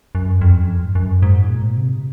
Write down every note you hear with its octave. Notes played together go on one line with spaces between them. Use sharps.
F#2
F2
F#2
F2
G#2
F#2
G#2
A#2
C3